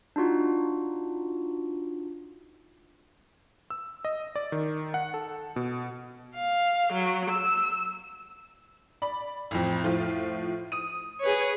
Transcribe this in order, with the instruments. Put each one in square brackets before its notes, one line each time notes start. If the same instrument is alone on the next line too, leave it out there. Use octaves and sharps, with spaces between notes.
[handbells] D4 D#4 F4 F#4
[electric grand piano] E6
D#5
D5
D#3
F#5
A4
B2
[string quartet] F5
F#3
E6
[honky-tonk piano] D5 B5
A1 F2
A2 F3 F4
D#6 D#7
[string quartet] G#4 B4 C#5